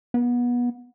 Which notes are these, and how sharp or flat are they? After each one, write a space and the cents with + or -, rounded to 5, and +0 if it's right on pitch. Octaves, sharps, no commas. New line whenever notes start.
B3 -25